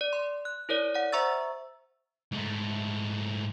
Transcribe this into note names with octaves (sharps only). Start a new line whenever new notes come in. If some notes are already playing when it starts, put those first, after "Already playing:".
D5
C6
F#6
E4 A#4 C#5 D5
D5 F#5
C5 E5 A#5 C#6 E6 A6
G#2 A3